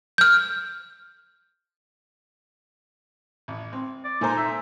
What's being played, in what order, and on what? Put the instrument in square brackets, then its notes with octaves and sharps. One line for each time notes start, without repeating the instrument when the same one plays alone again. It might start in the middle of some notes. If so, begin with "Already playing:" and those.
[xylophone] F6 G6
[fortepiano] A1
C4
[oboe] D5
[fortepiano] A#2 A4 C5 [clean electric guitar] D#4 G#5 A#5
[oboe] E5